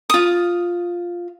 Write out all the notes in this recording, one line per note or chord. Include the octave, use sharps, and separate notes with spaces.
F4 D#6